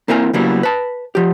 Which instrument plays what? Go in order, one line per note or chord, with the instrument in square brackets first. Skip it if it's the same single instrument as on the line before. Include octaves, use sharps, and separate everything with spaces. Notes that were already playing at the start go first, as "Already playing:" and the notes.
[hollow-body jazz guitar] A#3 C4 E4 A#4 G#5
C#3 F#3 G3 A#3 B3 E4
B4 A5
F3 G4